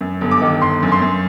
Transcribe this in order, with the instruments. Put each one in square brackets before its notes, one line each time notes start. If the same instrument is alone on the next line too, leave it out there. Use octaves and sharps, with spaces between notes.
[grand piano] F#2
G1
D6
D#3
G1 C6
F#2
C6
F#2